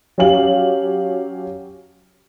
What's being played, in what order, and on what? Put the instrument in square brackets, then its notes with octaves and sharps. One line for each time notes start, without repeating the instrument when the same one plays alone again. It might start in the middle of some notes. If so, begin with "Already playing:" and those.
[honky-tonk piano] F#3 C#4 G4 F5 F#7